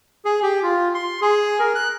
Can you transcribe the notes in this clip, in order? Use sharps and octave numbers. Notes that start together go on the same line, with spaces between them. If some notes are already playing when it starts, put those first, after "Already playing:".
G#4
G4
F4
C6
G#4
A#4
F#6